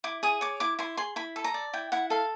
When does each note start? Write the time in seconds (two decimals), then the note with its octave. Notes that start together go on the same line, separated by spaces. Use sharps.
0.04 E4 D6
0.23 G#4 D#6
0.41 C#5 D6
0.60 E4 D6
0.79 E4 C6
0.97 G#4 C6
1.16 E4 B5
1.36 A4
1.44 A#5
1.54 D5
1.73 E4 G5
1.92 E4 F#5
2.10 A4 F5